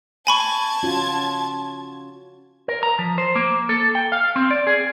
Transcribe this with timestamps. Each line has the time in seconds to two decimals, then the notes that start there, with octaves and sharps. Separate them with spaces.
0.27 G#5 A5 B5 C#6 G#6
0.83 C#4 F4 F#4
2.68 A#4
2.83 A#5
2.99 F3
3.18 C5
3.36 A#3
3.69 A4
3.95 G5
4.12 F5
4.36 C4
4.51 D5
4.67 G#4